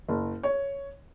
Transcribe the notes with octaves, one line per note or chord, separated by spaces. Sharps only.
F#1
C#5